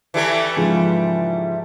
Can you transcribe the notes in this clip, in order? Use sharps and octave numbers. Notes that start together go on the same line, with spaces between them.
E3 G3 A3
G#2 C#3 F3